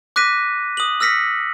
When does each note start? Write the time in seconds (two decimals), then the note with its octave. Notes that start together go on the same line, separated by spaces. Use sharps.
0.16 D6 F#6 A#6 B6 D#7
0.77 D#6 F#7
1.00 E6 F6 A#6 B6 C#7